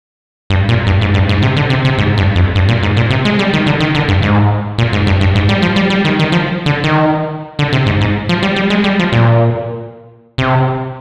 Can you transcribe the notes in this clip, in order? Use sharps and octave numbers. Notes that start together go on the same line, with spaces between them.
G2
A#2
G2
G#2
G2
G#2
C3
D3
C3
C3
G#2
G2
F2
G2
A#2
G#2
A#2
C3
G#3
G3
D#3
D3
D#3
D3
G2
G#2
A#2
G#2
G2
G2
G#2
G3
F3
G3
G3
D#3
D#3
F3
D3
D#3
D3
C3
G#2
G#2
F3
G3
G3
G#3
G3
F3
A#2
C3